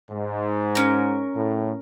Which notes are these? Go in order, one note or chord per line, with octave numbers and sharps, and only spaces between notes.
G#2
C#4 A#4
A2